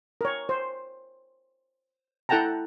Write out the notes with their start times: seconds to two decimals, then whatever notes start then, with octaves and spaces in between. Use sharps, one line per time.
0.21 A#4 C#5
0.49 C5
2.29 E4 A4 F#5 G5 A5 A#5